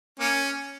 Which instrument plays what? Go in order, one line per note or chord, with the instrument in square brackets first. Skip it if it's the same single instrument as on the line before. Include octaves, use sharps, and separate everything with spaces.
[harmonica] A#3 C#4